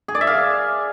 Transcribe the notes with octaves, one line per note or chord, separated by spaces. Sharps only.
G#4
D5
E5
F5